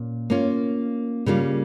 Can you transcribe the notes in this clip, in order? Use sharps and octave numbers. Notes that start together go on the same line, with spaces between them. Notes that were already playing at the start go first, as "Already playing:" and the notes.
Already playing: A#2 C#4
A#3 C#4 F4
C#3 G3 A#3 F4